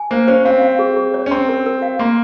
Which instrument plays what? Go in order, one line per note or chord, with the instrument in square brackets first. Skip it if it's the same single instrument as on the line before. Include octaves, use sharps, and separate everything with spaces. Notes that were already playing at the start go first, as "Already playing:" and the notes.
Already playing: [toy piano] G#5
[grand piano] A#3 [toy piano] C5
[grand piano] C#4 [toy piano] C5
[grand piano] C4 [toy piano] F5
[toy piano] F5
G#4
G#4
C#5
[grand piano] C#4
[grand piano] C4 [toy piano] C6
[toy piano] A#4
A#4
F5
[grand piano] A#3 [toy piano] C6